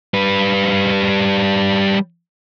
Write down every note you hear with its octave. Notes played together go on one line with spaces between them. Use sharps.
G3 B4